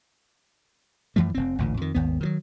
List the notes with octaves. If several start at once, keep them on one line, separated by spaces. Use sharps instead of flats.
F#2 E3 F3 A3
F1 C4
A1 D2 A#2
F2 D#3
G#1 D#2 B3
D#3 E3 F#3